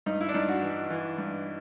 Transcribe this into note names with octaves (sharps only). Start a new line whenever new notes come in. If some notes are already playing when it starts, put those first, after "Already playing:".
G2 D#4
E4
D4
G2 D#4
F#4
E3
E3
G2